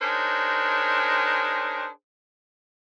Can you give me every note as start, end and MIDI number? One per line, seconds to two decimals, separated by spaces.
0.01 1.87 62
0.01 1.87 63
0.01 1.87 68
0.01 1.87 70
0.01 1.87 72
0.01 1.87 73